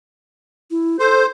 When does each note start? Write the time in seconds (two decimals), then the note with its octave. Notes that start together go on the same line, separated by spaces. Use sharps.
0.71 E4
0.99 A4 C5